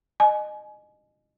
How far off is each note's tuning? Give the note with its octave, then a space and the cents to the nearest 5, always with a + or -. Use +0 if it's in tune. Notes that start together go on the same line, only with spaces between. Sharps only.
D#5 -25 G#5 +25